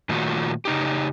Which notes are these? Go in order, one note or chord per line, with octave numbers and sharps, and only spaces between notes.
A#2 D#3 A3 F4 F#4
C#3 D#4 G4